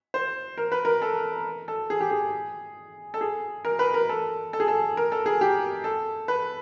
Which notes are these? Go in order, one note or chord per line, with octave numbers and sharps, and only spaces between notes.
C5
A#4
B4
A#4
A4
A4
G#4
G4
G#4
A4
G#4
A#4
B4
A#4
A4
A4
G#4
A4
A#4
A4
G#4
G4
A4
B4